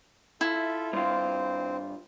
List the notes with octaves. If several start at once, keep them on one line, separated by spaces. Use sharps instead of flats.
E4 F4 A4 E5
G2 C4 F4 C5